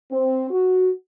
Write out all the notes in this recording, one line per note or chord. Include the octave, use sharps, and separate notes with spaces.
C4
F#4